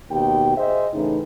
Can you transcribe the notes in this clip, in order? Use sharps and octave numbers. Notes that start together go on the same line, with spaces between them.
D#2 B2 G4 G5
G#4 C5 D#5 E5
A2 C#3 E3 D#4